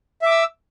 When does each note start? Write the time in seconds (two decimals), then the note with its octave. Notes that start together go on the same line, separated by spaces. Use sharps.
0.22 E5
0.26 D6
0.31 E6